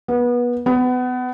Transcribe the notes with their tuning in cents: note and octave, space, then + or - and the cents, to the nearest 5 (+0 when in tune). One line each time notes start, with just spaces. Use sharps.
B3 -25
B3 +25